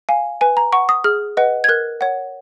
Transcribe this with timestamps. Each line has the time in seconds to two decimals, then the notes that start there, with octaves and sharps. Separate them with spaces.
0.09 F5 G#5
0.41 B4 G#5
0.57 A#5
0.73 F#5 C#6
0.89 D#6
1.04 G#4 F6
1.37 B4 D#5 F#5
1.64 G#6
1.69 A#4 F#6
2.01 C#5 F#5